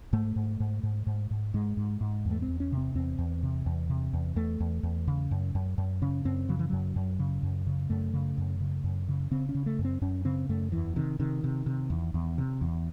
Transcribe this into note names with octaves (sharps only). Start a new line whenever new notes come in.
G#2 A3
G#2
G#2
G#2
G#2
G#2
G#2 G#3
G#2
G#2
E2
A3
C4
E2
C#4
C3
C4
E2 C4
E2
C3
E2
C3
E2
E2 A3
E2
E2
C#3
F#2
F#2
F#2
C#3 C#4
F#2 C4
C#3 F#3
E3
F#2 F#3
F#2
C#3
F#2
C#3
F#2 A3
C#3
F#2
C#3
F#2
C#3
C#3 C4
C#4
C#3
A3
F#2
C4
F#2 C#4
C#3 C4
F#2 A3
E2 E3
C3 D#3
C3 D#3
C3
C3
E2
E2
C3
E2